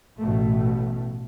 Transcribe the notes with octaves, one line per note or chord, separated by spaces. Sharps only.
A1 B2 A3